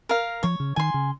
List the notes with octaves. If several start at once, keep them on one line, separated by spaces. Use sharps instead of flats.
A#4 F5
F3 C#5
C#3
D#3 G#5 C6
C#3